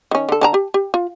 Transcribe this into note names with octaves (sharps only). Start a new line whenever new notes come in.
D#3 C#4
D3 A4
D3 A5 A#5
G4
G4
F4